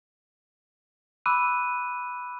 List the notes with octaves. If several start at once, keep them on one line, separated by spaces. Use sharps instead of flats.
B5 D6 E6 F#6 D#7